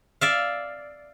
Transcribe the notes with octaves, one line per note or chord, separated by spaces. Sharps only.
D5 E5 F5